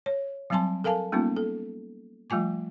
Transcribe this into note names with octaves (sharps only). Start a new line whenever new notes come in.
C#5
F#3 G3 C4 G#5 A5 C6
A4 A#4 F5 G#5 A5
G3 A#3 B3 C#4 D#4 F4
A4
F3 G3 A3 F4 G#5 D6